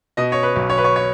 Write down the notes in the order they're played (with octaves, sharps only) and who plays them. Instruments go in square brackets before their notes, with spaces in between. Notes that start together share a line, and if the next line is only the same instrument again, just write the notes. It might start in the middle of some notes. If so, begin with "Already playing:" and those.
[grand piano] B2 D#5
C#5
B4
B1
C#5
B4
C#5
C#5